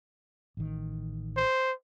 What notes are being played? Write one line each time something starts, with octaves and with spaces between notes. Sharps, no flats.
A1 D#3
C5